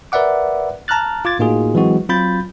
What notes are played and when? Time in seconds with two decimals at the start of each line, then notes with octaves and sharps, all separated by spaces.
0.12 A#4 B4 D5 E5 F#5 D6
0.88 A5 A#5 F6 F#6 A6
1.25 F4 D6 G#6 A6
1.39 A2 A#3 D#4 F4 F#4 G#4
1.75 E3 F#3 G#3 C4 F#4
2.09 F#3 C4 F4 B5 G6 A6